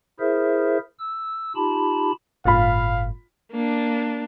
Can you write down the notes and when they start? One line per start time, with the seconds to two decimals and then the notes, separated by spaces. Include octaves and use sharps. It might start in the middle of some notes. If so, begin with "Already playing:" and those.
0.20 E4 G#4 A#4 C5 E5
0.99 E6
1.55 D#4 F4 G4 A5 B5
2.45 G1 A2 F4 F5 B5
3.51 A#3 D4